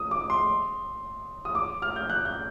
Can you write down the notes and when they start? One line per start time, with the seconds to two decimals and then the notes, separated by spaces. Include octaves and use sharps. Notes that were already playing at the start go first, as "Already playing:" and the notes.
Already playing: D#6
0.11 D6
0.30 C6
1.45 D#6
1.55 D6
1.82 F6
1.96 G6
2.10 F#6
2.25 G6